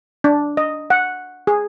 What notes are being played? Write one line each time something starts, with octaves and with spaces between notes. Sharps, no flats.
D4
D#5
F#5
G#4